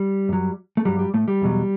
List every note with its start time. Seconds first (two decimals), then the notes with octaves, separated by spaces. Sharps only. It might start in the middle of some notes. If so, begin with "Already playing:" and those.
Already playing: G3
0.29 F#2 F#3
0.77 A3
0.85 G2 F#3 G3
0.99 G3
1.14 A2 A3
1.28 G3
1.42 E2 B2 F#3